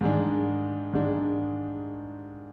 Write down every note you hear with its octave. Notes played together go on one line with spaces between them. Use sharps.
G#2 D#3 G#3 D4
G#2 D#3 G#3 D4